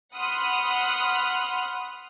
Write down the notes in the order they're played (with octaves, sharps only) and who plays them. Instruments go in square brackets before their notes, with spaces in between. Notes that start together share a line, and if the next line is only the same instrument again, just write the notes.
[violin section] F#5 B5 C6 D#6 F6 F#6